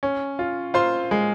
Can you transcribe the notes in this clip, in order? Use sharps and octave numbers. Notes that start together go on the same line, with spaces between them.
C#4
F4
F4 C5 C6
G#3